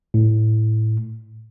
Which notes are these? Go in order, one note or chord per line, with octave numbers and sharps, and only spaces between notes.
A2